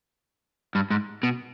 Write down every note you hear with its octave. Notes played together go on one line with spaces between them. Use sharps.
G2
G#2
B2